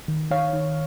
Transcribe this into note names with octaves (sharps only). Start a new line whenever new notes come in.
D#3
D#3 C#5 F5
D#3